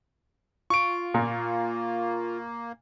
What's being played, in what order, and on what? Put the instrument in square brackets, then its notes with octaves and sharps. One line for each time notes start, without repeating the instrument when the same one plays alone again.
[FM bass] F4 [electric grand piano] C#6 D7
[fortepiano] A#2 [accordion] A#3